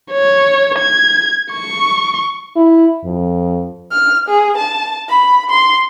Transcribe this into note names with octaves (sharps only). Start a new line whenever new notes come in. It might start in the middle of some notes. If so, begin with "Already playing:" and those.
C#5
G#6
C#6
E4
F2
F6
G#4
A5
B5
C6